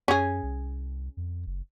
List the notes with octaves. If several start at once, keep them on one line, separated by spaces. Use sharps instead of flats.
F#2 C#4 G#4
C2
F2
F#1